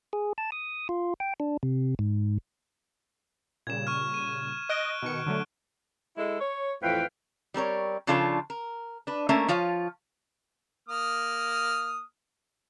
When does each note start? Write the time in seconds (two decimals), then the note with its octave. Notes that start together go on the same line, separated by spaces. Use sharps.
0.13 G#4
0.38 A5
0.52 D#6
0.89 F4
1.20 G5
1.40 D4
1.63 C3
1.99 G#2
3.67 A#2 C#3 G3 G#6 E7
3.87 C#6 F6
4.14 D#7
4.69 D#5 F#6 D7 G7
5.02 B2 D#3 C#7
5.26 D3 F#3 A3
6.17 G#3 E4 A4
6.39 C#5
6.82 F2 A2 E3 B4 F5 G5
7.54 G3 C4 A#4 C#5
8.07 C#3 F3 D4 F4 A4 C#5
8.50 A#4
9.07 D4 B4
9.29 A3 A#3 C#4 A#4 E5
9.48 F3 F4 C#5 F5
10.89 A#3 D#6 F6